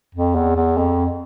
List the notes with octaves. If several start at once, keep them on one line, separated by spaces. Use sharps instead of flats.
F2
E2
E2
F2